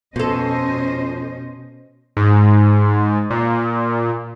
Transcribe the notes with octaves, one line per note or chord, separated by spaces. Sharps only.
F2 B2 C#4 A4 C5 D#5
G#2
A#2